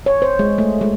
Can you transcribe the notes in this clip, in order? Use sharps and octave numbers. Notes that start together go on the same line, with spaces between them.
C#5
C5
G#3
A3
G#3